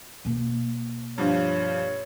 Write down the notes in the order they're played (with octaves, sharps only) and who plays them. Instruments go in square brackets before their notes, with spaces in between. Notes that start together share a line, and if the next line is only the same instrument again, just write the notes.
[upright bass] B2 A#3
[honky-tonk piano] G2 F3 [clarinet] C#5